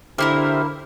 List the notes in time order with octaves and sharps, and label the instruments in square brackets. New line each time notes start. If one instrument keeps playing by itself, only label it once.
[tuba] D3 [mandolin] A#3 E4 A#4 [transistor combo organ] G4 C5 E5